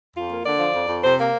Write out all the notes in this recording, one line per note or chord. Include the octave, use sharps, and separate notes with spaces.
F2 F4
A#3
D3 D5
F3
F2
F2
C3 C5
A#3